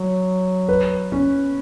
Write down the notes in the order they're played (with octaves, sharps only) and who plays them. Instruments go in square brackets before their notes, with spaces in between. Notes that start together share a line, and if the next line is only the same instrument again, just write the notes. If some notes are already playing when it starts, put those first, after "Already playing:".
Already playing: [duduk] F#3
[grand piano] B4
C#4